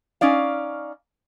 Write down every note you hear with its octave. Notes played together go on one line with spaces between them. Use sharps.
C#4 D#4 D5 F5